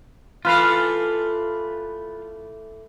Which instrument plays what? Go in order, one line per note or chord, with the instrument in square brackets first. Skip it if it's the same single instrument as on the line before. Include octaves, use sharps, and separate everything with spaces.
[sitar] E3 A3 [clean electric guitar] F4 B4 F5